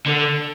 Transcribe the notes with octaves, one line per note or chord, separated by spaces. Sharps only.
D3